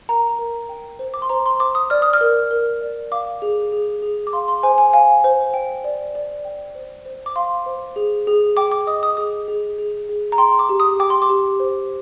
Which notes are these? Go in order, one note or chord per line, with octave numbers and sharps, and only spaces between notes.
A#4 A#5
A#4
G5
C5
D6
C6
C5 A#5
C6
C5 D6
D#6
D5 F6
D#6
F6
A#4
A#4
D5
F5 D6
G#4
G#4
G#4
D6
F5 C6
C6
C5 G#5
G#5
F5 G#5
C5
G5
D5
D5
G5
C5
C5
D6
F5 C6
C5
G#4
G#4
G5 D6
D6
D#5 D#6
D#6
G#4 D#6
G#4
G#4
G#4
A#5
G5 C6
D6
G4
D#6
G5 D6
C6
D6
G4
C5